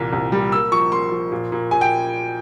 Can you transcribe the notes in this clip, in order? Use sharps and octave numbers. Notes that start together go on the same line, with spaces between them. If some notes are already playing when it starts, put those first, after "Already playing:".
Already playing: C2 A#2 E3
C2
G3
A#3 E6
F3 C#6
A#3 C6
F3
A#2
A#2
A#2 G#5
G5